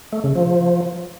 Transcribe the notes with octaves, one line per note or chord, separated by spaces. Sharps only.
A3
C#3
F3